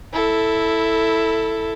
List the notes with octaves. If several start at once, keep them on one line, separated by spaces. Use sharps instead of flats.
E4 A4